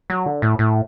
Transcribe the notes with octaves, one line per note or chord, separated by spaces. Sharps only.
F#3
D3
A2
A2